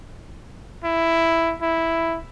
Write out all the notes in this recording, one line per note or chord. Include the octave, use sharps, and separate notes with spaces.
E4
E4